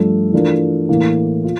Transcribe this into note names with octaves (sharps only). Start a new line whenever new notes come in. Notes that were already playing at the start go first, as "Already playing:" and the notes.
Already playing: G2 F3 A3 D4
E3 A3 D4 F4 A#4
A2 E3 A#3
F4